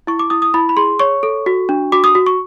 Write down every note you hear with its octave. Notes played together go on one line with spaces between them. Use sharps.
E4 C#6
D6
E4 D#6
D#6
E4 B5
B5
G#4 C6
C#5 C#6
A4
F#4
D4
F#4 D6
D#6
F#4
C#6